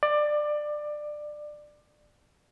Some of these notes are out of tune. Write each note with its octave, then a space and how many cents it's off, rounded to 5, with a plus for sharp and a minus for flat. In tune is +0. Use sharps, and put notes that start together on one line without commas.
D5 +20